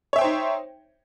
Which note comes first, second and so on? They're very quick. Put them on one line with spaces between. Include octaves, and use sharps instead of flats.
C#5 E5 G5 C5 D#4